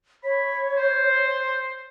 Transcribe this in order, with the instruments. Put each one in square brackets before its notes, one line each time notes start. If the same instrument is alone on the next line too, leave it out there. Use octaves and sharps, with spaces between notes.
[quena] C#5 [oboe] B5
[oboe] C5